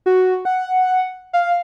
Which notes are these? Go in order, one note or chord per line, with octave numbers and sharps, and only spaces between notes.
F#4
F#5
F5